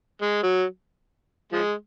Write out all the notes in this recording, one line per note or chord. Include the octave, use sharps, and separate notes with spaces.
G#3
F#3
F3 G#3